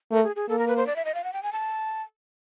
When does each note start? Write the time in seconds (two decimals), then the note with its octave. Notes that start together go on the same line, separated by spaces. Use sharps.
0.11 A3 A#4
0.23 G#4
0.36 G#4
0.49 A#3 A4
0.59 A#4
0.68 B4
0.77 C5
0.87 D5
0.96 E5
1.05 D#5
1.15 F5
1.24 F#5
1.33 G5
1.43 G#5
1.53 A5